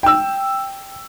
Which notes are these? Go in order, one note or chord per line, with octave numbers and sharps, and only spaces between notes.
G5 E6